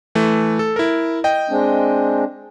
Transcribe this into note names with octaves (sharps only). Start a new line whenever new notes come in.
E3 A3
A4
E4 A#4
D#5 G5
G#3 C4 D4